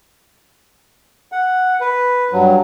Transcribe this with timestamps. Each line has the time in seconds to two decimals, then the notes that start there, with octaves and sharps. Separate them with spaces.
1.32 F#5
1.80 B4
2.32 G2 F#3